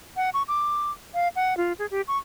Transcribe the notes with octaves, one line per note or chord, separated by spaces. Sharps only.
F#5
C#6
D6
F5
F#5
F4
G#4
G4
C#6